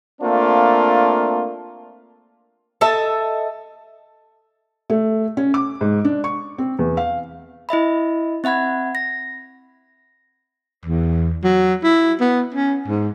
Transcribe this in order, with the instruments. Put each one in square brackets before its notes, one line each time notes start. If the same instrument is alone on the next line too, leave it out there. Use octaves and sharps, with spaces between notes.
[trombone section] A3 A#3 C4 D4 F4
[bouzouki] A4 D#5 E5 A5
[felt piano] A3
C#4
D6
G#2
D4
C#6
C4
E2
F5
[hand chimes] E4 D#5 E5 B5
C4 E5 F#5 B5 G#6
A#6
[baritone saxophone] E2
F#3
E4
B3
C#4
G#2